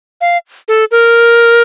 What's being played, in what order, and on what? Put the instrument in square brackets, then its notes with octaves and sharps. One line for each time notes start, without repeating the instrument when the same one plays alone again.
[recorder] F5
A4
A#4